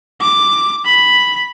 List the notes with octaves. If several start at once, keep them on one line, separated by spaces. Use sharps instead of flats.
D6
B5